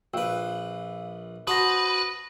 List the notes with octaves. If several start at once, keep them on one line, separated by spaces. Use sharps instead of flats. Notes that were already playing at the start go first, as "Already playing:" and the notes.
A#1 B4 F5 G5 E6
F#4 B4 C5 A5 D#6 A#6